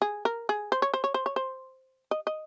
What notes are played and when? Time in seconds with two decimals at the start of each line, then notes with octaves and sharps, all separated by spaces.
0.02 G#4
0.25 A#4
0.49 G#4
0.72 C5
0.82 C#5
0.94 C5
1.04 C#5
1.14 C5
1.26 C#5
1.36 C5
2.11 D#5
2.27 D#5